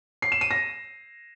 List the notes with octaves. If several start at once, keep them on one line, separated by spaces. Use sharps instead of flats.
C7
E7
D#7
A#6